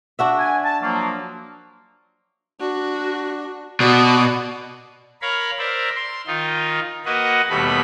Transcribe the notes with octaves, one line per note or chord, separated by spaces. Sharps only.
D4 F#4 E5
G#5
A5
F3 F#3 A#3
D4 F#4
B2 F#4 D5 D#6
A#4 C#5 F5 B5
A#4 C5 D5 E5
C6
D#3 D#4 F4
A#3 F#4 B4 D#5 F#5
D#2 B2 G3 A3 B3 B5